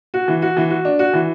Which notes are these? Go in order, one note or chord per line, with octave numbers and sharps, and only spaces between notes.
F#4
E3
F#4
E3
F#4
D4
F#4
E3